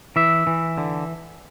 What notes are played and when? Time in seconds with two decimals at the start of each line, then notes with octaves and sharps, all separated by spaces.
0.16 E3 E5
0.47 E3
0.78 D3